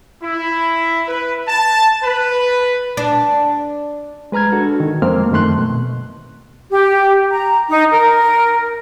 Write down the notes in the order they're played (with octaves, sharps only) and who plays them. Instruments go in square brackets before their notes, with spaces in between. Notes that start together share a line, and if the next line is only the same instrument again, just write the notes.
[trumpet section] E4
B4
A5
B4
[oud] D4
[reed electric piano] G#3 B4 A#5 F6 G#6
D4 F#4 A4
D#3
F2 F3 G#3 A#3 C4 F6
F#2 D#3 A3 C6 F#6
B2
[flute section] G4
A#5
D#4
A#4